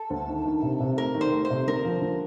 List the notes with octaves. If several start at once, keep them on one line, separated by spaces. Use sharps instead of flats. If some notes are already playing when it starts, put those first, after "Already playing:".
Already playing: A4
D2
D#3
D#3
C3
C3
A3 A#4
D#3
C5
A3
C5
C3
D3 A#4
F3
D3